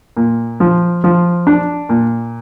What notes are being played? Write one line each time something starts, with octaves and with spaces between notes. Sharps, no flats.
A#2
F3
F3
D4
A#2